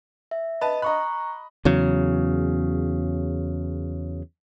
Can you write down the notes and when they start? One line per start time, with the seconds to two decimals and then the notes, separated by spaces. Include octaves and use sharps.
0.31 E5
0.61 B4 D#5 A5
0.82 D#5 A#5 B5 C#6 F#6
1.65 E2 C#3 F#3